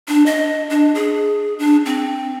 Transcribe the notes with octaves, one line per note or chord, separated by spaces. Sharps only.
D4
D#5
D4
G#4
D4
C4